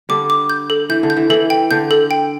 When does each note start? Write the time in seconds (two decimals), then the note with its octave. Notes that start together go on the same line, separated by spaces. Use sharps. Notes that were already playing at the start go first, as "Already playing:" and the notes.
0.09 D3 G3 D6
0.30 D6
0.50 G6
0.70 A4
0.89 E3 G6
1.03 D3
1.10 G6
1.17 E3
1.30 E3 A4
1.50 G5
1.71 D3 G6
1.91 A4
2.11 G5